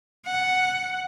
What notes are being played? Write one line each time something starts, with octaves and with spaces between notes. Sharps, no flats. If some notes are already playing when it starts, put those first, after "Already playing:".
F#5